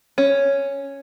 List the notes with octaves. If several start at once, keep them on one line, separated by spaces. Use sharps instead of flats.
C#4